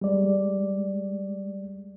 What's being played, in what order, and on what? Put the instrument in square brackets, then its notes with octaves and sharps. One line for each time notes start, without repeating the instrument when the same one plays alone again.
[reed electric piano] G3 G#3 D5